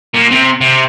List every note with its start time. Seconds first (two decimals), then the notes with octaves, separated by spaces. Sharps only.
0.14 A#2
0.31 C3
0.61 C3